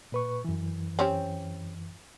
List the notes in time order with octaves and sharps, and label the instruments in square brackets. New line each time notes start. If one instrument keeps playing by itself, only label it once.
[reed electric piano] A#2 B4 C#6
F#2 E3
[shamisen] C4 C#4 G4